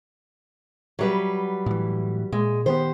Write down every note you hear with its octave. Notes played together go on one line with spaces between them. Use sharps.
F#3 G3 B4
A2 E3
A#2 G#3
D#3 B3 G4 C5